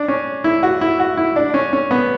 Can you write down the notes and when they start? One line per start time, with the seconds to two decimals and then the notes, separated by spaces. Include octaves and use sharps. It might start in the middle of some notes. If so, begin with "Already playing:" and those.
Already playing: D4
0.08 C#4
0.44 E4
0.63 F#4
0.81 E4
1.00 F#4
1.17 E4
1.36 D4
1.54 C#4
1.73 C#4
1.91 B3